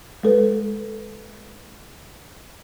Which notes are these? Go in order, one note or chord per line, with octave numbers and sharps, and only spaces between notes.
G#3 A4 B4